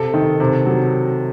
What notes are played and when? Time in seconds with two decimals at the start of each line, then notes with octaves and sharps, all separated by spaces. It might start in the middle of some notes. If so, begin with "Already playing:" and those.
Already playing: C3 A4
0.14 D#3
0.40 C3
0.66 F#3